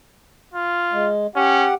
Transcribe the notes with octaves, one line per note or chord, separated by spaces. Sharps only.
F4
G#3
C#4 G4 F#5